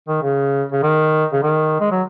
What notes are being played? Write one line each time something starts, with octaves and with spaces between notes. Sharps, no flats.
D#3
C#3
C#3
D#3
C#3
D#3
G#3
F#3